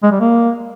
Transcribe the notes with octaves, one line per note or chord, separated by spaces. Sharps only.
G#3
G3
A#3